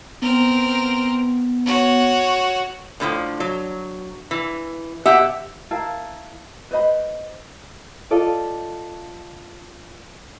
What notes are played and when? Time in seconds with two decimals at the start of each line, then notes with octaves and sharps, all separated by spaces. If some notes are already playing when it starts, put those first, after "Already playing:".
0.22 B3 C4 A#4
1.66 F#4 C#5
3.00 A2 D3 E3 F3
3.40 F#3
4.31 E3
5.06 B2 G4 E5 F#5 G5
5.71 E4 A#4 F5 A5
6.71 B4 C5 D#5 B5
8.11 F4 A4 D5 D#5